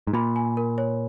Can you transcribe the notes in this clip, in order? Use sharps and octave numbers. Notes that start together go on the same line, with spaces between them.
G#2
A#2 B5
G#5
A#4
C#5